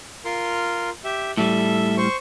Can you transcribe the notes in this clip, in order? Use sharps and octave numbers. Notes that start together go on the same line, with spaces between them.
F4 A#4 C6
G4 E5
A2 G3 A4 E5
C5 C#6